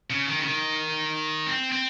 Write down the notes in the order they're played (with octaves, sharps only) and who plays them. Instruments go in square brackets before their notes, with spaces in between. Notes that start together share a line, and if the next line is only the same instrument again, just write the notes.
[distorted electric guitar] C#3
D#3
C#3
D#3
C4
C4